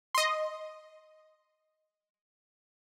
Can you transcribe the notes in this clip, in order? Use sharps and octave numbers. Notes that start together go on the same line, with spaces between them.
D#5 C6